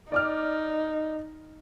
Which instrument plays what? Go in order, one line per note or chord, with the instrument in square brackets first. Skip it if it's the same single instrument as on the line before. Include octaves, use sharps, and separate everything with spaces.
[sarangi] D#4 [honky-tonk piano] D5 D6 F6